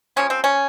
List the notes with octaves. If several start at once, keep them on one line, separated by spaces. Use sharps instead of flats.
C#3 F3 A#3 C#4
C4
C#4